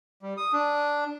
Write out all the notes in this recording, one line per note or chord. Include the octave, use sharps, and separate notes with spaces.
G3
D#6
D4